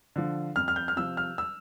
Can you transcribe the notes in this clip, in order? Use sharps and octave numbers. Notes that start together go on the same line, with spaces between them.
D3 F3
F2 F6
F6
G6
F6
C3 F3 E6
F6
E6